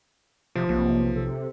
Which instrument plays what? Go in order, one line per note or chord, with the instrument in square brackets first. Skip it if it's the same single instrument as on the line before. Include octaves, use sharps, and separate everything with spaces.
[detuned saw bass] F1 [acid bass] C3 [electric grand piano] F3
[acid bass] B1 [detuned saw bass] C3 [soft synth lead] A#3
[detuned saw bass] C3 [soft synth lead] A4